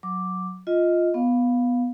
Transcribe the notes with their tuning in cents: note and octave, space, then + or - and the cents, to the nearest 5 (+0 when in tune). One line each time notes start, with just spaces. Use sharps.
F#3 -10 D6 +0
F4 +0 D#5 +15
B3 +0 F5 +10